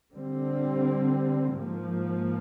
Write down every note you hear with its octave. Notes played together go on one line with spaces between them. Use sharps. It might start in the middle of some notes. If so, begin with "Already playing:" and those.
D3 G3 C4
G#2 F3 A#3